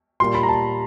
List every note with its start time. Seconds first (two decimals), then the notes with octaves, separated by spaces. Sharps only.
0.20 A#2 G3 A#3 C6
0.35 B5
0.43 A#5
0.49 A5